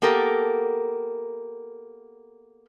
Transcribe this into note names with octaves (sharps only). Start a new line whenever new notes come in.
A#3 B3 G4 A4 A#4